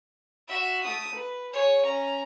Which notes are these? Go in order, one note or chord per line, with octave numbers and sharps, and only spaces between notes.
F#4 E5
A3 D#6
B4
G#4 C#5
C#4 A#5